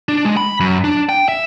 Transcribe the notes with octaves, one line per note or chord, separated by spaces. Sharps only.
D4
G#3
B5
F#2
D4
G5
E5